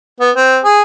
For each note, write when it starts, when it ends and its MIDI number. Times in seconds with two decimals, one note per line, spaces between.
0.20 0.31 59
0.36 0.58 60
0.64 0.82 68